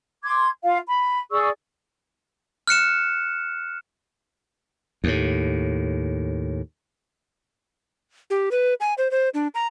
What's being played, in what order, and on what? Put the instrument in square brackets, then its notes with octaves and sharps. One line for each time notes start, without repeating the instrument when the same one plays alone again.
[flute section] C6 D6 G#6
F4 F5
B5
G#4 D5 C#6 E6
[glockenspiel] F6 F#6 C#7 E7
[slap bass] D#2 A2
[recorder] G4
B4
G#5
C5
C5
D4
A#5